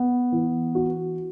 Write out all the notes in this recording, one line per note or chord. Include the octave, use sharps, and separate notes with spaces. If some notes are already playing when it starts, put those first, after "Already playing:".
Already playing: B3
E3
F#4